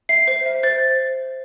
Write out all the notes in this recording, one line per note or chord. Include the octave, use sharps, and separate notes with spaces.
E5 C7
C5
E5
C5 A6